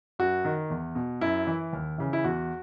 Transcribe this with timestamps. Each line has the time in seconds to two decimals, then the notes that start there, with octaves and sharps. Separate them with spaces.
0.19 F#2 F#4
0.45 D#3
0.70 E2
0.95 B2
1.21 F#2 E4
1.47 E3
1.73 D#2
1.98 C#3 E3
2.13 E4
2.24 E2 F#4